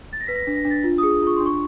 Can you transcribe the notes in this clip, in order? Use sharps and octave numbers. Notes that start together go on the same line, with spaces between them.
A6
A#6
B4 B6
A#6
D4 B6
A#6
D4
A6
F4
G#4 D#6
F4 C#6
D4 C6
C#6